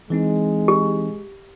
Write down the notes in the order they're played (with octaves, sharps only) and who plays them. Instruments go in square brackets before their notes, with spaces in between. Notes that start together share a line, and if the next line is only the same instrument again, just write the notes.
[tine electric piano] E3 C4 D#4 [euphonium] G#3
[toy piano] G4